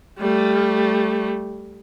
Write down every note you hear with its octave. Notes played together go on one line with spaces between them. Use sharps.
G3 A3